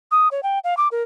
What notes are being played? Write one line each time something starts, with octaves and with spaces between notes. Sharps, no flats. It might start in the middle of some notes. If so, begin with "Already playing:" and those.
D#6
C#5
G5
F5
D6
A#4